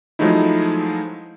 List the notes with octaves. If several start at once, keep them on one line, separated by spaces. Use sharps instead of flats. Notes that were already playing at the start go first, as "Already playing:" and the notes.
F3 F#3 G#3 A3 D#4 E4